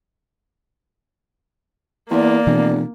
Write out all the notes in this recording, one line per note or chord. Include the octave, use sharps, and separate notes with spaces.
E2 A#3 D5
F1 B2 E3 B3